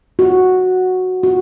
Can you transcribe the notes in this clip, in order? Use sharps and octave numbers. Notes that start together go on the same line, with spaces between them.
F#4
F#4